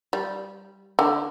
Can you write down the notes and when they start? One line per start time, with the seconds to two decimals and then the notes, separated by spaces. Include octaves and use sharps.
0.13 G3
0.99 D3